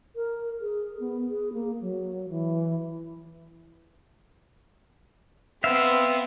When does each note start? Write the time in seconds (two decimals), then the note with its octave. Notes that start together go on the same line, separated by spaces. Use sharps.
0.16 A#4
0.61 G#4
1.00 B3
1.28 G#4
1.53 A#3
1.81 F#3
2.29 E3
5.64 B3 C4 E5 F5